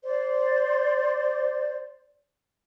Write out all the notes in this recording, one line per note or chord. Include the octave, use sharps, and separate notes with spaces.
C5 D5